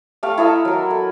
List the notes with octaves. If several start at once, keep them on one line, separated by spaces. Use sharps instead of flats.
A3 G4 A4 F5
E4 A4 D#5 A#5
F#3 A#4
A4